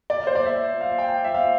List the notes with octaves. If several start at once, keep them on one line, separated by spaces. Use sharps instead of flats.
D5
C5
D5
E5
F5
G5
E5
F5